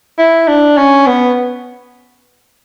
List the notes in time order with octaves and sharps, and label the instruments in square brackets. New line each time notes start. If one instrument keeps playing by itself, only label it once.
[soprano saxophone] E4
D4
C#4
B3